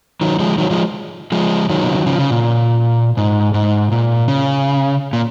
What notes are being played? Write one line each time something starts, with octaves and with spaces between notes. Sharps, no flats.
D#3 F#3
F3 G#3
D#3 F#3
F3 G#3
F3 G#3
D#3 F#3
B2
C#3
D#3
C#3 F3
C#3
A#2
G#2
G#2
A#2
C#3
A#2